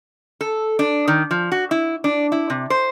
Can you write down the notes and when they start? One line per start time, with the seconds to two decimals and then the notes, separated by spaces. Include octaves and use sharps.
0.41 A4
0.79 D4
1.08 D#3
1.31 F3
1.52 F#4
1.71 E4
2.04 D4
2.32 E4
2.50 C3
2.70 C5